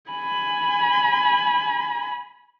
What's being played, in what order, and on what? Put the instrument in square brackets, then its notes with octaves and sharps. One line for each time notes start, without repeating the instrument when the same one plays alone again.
[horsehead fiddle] G#5 B5